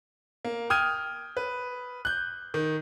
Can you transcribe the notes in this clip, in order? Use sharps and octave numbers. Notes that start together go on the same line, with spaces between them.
A#3
G5 D#6 F6 G#6 D#7
B4
F#6 G6
D#3